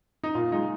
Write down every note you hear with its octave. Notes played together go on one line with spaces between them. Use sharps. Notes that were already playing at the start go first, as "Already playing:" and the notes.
D#4
A#2 F4
G#3 D#4